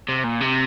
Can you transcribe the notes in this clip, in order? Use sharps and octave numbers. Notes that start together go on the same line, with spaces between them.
C3
A#2
C3